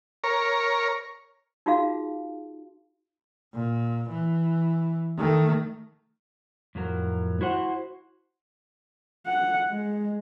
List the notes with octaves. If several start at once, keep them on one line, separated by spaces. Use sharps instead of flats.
A#4 C#5
D#4 F4 F#4 G#4 F5
A#2
E3
D#3 A3
F2 A2 F#3 A#4
E4 F#4 C5 F#5
F#5
G#3